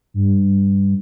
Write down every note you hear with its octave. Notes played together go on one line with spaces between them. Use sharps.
G2